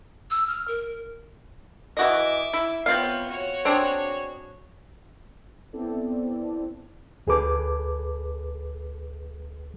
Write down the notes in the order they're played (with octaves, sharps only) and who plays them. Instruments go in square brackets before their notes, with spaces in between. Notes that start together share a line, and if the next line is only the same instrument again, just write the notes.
[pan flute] E6
F6
A#4
[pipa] E3 F#4 D#5 [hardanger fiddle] E5 D6
[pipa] E4
[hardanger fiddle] B3 C#5 [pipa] C4 F4 F5
[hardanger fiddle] F#4 C#5
[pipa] C4 D4 G#4
[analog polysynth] B3 C4 E4 A4 D5
[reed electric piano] D2 G#4 A4 B4 D6